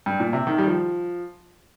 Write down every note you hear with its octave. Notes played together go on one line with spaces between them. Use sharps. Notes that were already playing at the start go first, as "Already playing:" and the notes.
G2
A#2
C3
D#3
G3
F3